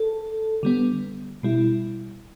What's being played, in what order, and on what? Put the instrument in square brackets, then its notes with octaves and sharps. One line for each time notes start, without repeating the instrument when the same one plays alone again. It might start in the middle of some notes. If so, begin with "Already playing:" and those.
Already playing: [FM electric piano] A4
D3 G3 B3
B2 G3 E4